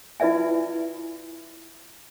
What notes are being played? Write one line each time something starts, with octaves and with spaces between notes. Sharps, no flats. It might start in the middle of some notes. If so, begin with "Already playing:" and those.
E4 F4 B4 D5 E5 G#5